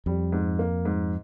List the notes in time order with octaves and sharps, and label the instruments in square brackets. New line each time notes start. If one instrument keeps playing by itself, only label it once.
[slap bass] F2 [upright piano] G3
[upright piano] G#2
A#3
G#2